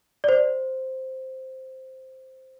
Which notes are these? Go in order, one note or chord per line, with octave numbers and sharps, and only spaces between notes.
D5
C5